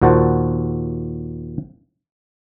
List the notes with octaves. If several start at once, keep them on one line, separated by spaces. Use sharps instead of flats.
D#2 A#2 F#4 C5 F#5 A5